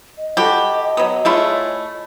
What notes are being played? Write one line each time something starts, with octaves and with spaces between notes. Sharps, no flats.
D#5
F#4 G4 A4 B5
F#3 B3
A3 E4 F4 G#4 C#5